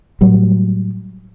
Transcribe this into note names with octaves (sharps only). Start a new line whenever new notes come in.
A2 F#3 G3